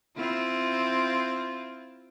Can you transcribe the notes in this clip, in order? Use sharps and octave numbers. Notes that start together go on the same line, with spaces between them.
C4 E4 F4